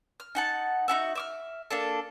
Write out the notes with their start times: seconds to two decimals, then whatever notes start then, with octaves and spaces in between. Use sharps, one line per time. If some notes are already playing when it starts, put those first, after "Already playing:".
0.20 F6
0.35 D#4 F#5 A5
0.88 D#4 E4 F#4 E5
1.15 E5 D6 F6
1.71 A#3 D4 A4